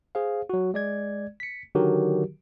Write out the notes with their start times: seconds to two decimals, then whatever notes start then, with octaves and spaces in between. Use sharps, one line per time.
0.15 G#4 C5 F5
0.49 F#3 F#4
0.74 G#3 D5 G#6
1.40 B6 C#7
1.75 D3 D#3 F#3 F#4 G4 A#4